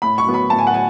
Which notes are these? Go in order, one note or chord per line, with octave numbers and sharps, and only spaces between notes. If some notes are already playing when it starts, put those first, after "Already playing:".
A2 B5
C#6
F#3 B3
B5
A2 A5
G#5
F#5
F#3 G#5